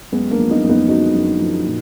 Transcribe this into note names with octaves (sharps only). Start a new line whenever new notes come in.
F#2 G#3 B3
A#3 D4
F3
B3 D#4
F#2
B3 D#4
D3 D#4 F#4
F#2
F3
A#2